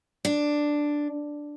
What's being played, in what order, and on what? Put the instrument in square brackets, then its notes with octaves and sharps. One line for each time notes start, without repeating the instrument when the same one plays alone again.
[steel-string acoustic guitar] D4